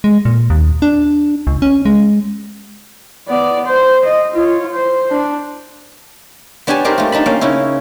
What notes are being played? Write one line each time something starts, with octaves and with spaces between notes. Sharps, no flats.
G#3
A#2
D#2
D4
C#2
C#4
G#3
B3 D5
C5
D#5
F4 C#5
C5
D4
B3 D4 G4 C#5 G#5 A5
C4 D4 D#4 G4 A#4 C5
A3 D#4 F4
D4 D#4 A5 B5
A#3 C#4 F5 G5
C#3 C#4 D#4 E4